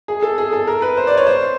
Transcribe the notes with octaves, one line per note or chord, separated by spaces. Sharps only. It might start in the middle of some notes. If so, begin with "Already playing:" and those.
G#4
A4
G#4
A4
A#4
B4
C5
D5
C#5
C5